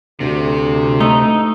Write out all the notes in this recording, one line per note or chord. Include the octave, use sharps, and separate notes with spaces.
D2 C3
A3 D#4